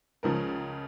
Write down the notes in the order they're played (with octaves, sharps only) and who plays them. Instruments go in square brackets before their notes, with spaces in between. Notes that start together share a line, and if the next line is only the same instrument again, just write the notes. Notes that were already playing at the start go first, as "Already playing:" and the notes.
[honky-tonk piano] C#2 C#3 F3 A#4